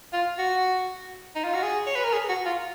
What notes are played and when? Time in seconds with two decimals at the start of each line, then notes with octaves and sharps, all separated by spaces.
0.13 F4
0.38 F#4
1.35 D#4
1.44 F4
1.54 F#4
1.63 G#4
1.86 C#5
1.96 B4
2.03 A#4
2.13 G#4
2.29 F#4
2.46 F4